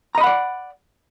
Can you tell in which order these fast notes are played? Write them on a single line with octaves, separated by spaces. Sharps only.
A#5 D#5 B5 F#5 D5